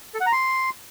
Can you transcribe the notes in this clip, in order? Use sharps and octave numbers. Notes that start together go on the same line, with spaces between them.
A4
F#5
A#5
C6